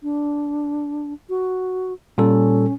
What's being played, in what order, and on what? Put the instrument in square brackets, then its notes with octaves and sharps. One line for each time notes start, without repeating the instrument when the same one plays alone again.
[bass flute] D4
F#4
[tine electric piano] A#2 G3 A4 [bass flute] C#4